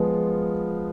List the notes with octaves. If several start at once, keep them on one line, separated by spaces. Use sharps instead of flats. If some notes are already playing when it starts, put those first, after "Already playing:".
Already playing: F3 G#3 B3 F4